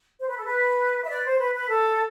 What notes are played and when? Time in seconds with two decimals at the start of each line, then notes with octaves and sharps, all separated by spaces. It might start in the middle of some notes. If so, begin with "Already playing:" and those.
0.19 C5
0.27 B4
0.37 A4
0.45 B4
1.04 E5
1.08 B4 D5
1.24 C5
1.39 B4
1.54 B4
1.68 A4